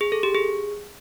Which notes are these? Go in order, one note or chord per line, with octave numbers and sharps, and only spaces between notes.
G#4
A4
G4
G#4